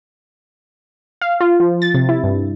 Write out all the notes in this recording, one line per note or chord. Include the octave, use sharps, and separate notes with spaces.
F5
F4
F3
A6
C3
E4
G2